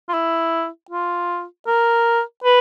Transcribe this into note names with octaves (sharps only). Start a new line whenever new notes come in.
F4
E4
F4
A#4
B4